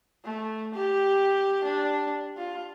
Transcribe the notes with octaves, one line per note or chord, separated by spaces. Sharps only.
A3
G4
D4
F4